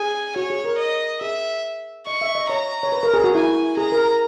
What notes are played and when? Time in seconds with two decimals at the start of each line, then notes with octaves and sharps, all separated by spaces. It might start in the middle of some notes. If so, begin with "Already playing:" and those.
Already playing: G#4 G#5
0.36 F#4 C#5
0.50 G#4
0.65 A#4
0.78 D#5
1.21 G#4 E5
2.07 D#5 C#6
2.22 E5
2.35 D#5
2.50 C#5 A#5
2.83 C#5
2.92 B4
3.03 A#4
3.14 G#4
3.24 F#4
3.35 E4 G#5
3.77 G#4 A#5
3.92 A#4
4.05 A#4